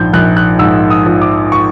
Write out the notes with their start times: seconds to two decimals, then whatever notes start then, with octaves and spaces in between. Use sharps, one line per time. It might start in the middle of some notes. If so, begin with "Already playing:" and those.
Already playing: A#1 G#2 F3 G6
0.13 A#1 F#6
0.37 F#6
0.59 G#2 E6
0.90 D#6
1.06 F3
1.21 D6
1.52 C#6